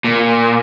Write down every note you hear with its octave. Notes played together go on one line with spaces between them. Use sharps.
A#2